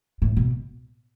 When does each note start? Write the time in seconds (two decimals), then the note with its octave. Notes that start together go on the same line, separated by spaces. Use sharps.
0.22 A2
0.37 B2